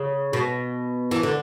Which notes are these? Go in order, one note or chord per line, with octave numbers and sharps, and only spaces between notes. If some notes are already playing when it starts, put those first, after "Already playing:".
Already playing: C#3
B2
E3
D3